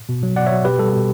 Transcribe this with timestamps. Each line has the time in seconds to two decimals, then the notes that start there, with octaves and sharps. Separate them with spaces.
0.09 B2
0.23 F#3
0.36 B2 D5 F#5
0.46 C#5 E5
0.51 F#3
0.65 B2 G4 B4
0.79 G3 A4
0.93 B2